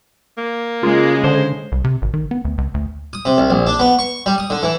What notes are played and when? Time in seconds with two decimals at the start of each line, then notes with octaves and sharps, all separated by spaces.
0.38 A#3
0.83 C#3 G#3 F4
1.24 D3 C5
1.72 C2
1.84 C3
2.02 G#1
2.14 D#3
2.31 B3
2.45 D2
2.58 C#2
2.74 D2
3.13 D#6
3.25 C3
3.38 C2
3.50 A#1
3.67 D4
3.80 B3
3.99 C#6
4.26 G3
4.38 D#6
4.50 D3
4.63 E3